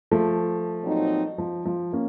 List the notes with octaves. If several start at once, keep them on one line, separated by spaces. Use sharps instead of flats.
F3 A3
A#2 F#3 C4 D#4
F3
F3
A#3 C#4